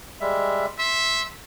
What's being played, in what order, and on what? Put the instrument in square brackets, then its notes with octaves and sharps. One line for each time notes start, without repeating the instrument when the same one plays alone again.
[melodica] G3 G#3 E5
[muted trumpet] E5 [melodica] C6